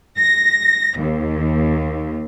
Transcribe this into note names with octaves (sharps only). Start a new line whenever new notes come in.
A#6
D#2